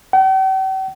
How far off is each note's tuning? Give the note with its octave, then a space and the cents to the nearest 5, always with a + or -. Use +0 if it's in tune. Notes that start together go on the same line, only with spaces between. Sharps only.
G5 -45